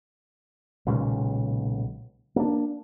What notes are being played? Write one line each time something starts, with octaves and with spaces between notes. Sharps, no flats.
B1 A#2 C#3 G#3
A#3 D4